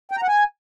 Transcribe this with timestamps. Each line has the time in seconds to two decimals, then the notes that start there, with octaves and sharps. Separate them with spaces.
0.11 G5
0.17 A#5
0.23 F#5
0.28 G#5